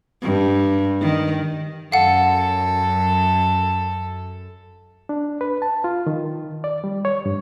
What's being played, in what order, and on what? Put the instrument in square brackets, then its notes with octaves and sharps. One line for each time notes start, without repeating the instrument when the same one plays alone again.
[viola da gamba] G2
D#3
[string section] F#2 [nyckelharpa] A4 [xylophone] F5 F#5
[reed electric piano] D4
B4
A5
F4
D#3
D5
G3
C#5
G2